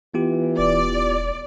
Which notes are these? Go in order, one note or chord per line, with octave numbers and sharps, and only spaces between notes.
E3 B3 F4 G4
E1 D5